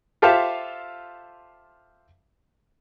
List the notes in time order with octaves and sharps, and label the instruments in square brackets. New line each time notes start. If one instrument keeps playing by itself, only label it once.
[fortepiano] F4 G4 A4 C5 E5 F5